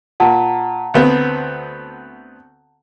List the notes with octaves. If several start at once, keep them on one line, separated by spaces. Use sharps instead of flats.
A#2 F#5 A5 A#5
D2 B3 C4